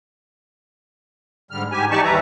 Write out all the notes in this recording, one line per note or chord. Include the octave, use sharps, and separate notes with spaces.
G#2 D3 G3 F6
G#2 G4 G#5
E3 D#4 G4 D5 A5 C#6
D#2 G3 B4 E5 A#5